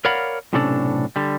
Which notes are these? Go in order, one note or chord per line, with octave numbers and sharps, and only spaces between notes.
A#4 C#5 D5 F5 F#5 B5
B1 A2 C3 C#4 D4 A4
D3 G3